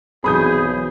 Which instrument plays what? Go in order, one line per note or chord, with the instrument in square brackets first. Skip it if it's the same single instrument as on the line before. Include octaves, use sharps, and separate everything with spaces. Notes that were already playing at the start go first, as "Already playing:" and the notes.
[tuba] B1 [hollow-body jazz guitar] E3 F#3 C4 [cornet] G#4 [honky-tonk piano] B5 D#6 G6